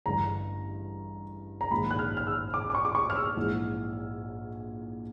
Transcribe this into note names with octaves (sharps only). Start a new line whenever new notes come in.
A1 G2 D3 A#5
A#5
A#1 G#2 D#3 B5
F#6
F6
F6
E6
D6
D6
C#6
D6
C#6
F6
E6
A#1 G#2 E3 G#3